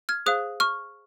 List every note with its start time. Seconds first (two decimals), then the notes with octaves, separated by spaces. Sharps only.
0.09 F6 G#6
0.26 G#4 C5 F5 D#6 F#6
0.60 C#6 F6